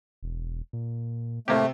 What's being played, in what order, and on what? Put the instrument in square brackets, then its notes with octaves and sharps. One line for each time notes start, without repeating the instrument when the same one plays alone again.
[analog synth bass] E1
A#2
[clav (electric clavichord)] A2 A#3 G4 [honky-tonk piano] C3 C4 [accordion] A3